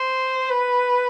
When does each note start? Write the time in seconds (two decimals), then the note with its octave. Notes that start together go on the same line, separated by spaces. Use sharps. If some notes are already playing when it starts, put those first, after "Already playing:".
Already playing: C5
0.50 B4